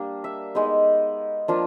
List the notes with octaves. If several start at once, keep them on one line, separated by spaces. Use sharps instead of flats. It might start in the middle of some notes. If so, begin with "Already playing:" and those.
Already playing: G3 A#3 D4
E5
G#3 B3 D#4
F3 A#3 D4 F4